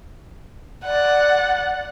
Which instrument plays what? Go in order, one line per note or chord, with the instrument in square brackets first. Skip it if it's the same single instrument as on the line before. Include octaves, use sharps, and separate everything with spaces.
[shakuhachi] D5 [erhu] F#5